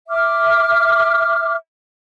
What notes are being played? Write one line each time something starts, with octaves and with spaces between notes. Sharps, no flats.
E5 D6 F6